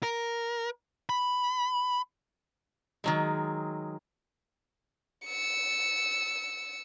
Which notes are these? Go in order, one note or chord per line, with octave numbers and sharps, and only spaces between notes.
A#4
B5
D#3 F#3 G#3
E6 C#7